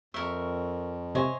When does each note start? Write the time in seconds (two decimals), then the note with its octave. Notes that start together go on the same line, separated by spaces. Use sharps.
0.14 F2 A#4 E5 C#6
1.15 C3 C5 C#5 D#5 E5 G#5